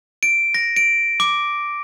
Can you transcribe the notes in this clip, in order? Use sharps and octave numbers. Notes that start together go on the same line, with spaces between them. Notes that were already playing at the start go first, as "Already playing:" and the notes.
D7
A#6
D7
D6